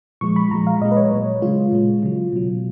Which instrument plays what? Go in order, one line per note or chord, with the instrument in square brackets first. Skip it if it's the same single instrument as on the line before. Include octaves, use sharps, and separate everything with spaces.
[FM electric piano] A#2 F3 G#3 C#6
B5
A#2 F3 G#3 A#5
F5
A#2 G#3 D#5
B4
C#5
A#2 F#3
C#3 G#3 F4
A#2 G#3
C#3 F#3
B2 F#3